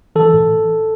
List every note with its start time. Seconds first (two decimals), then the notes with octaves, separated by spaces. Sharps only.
0.16 E3 A4
0.34 A2